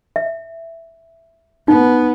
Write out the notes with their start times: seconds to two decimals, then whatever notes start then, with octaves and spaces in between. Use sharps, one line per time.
0.16 E5
1.68 B3 D#4